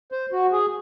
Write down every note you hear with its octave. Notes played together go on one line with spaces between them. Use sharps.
C5
F#4
G#4